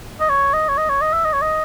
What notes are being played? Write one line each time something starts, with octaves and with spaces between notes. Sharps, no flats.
D#5
C#5
D#5
C#5
D#5
C#5
D#5
E5
D#5
C#5
D#5